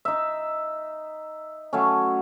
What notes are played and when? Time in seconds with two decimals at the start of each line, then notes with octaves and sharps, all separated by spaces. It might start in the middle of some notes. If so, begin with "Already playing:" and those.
0.05 D#4 E5
1.73 F#3 A3 C#4